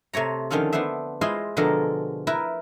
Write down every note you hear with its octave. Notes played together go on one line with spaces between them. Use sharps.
C3 A3 C#5 A#5
D3 D#3 F3 C#4 F4 A4
B3 D4 B4 C5 E5
G#3 E4 F4 C5 D#5
B2 D3 F3 G#3 A4 A#4
E4 A#4 B4